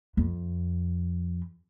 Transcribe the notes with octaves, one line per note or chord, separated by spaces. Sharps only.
F2